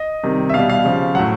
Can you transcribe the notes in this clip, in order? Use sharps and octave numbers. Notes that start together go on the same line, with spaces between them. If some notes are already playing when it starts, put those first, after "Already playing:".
Already playing: D#5
C3 D#3 G3
E5
B2 G3 F5
F5
C#3 F3
A2 F#3 F#5